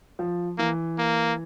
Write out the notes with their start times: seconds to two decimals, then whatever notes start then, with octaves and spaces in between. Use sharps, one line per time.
0.19 F3
0.58 E3 A#3
0.98 A#3